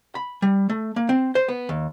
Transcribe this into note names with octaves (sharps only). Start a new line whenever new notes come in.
B5
G3
A3
A#3
C4
C5
B3
D#2